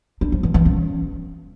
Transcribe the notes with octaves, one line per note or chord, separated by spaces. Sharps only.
D4
F3
E3
E3
C#4